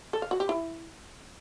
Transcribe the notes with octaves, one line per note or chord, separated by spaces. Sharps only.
A4
F5
F#4
G4
E4